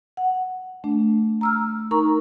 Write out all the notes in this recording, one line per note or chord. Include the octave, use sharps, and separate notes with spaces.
F#5
A3 D4
A#5 E6 F6
D#4 A#4 A#5 C#6